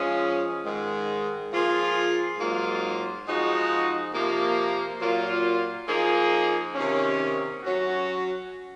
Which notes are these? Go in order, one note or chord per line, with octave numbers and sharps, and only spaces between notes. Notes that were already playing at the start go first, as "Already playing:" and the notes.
Already playing: F3 G#3 C#4
G#2 D#3 G#3
F3 A#3 F4 G#4
G#2 F#3 A#3 F4
F3 G#3 D#4 F#4
C3 F3 A#3
A#2 F#3 A#3 F4
F3 A#3 D#4 G#4
C3 D#3 A#3 C#4
F#3 C#4 F#4